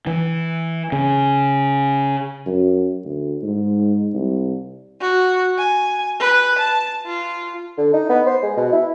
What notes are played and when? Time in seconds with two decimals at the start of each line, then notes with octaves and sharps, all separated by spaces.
0.07 E3
0.92 C#3
2.47 F#2
3.05 D2
3.43 G#2
4.14 C2
5.00 F#4
5.58 G#5
6.20 B4
6.59 A5
7.06 F4
7.78 D3
7.93 D#4
8.10 B3
8.27 C5
8.43 G#3
8.57 B2
8.72 E4